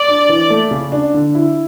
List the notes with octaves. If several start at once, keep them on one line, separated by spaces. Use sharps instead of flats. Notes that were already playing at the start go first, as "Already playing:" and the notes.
Already playing: D5
D4
E3
A3
C#3
D4
D3
E4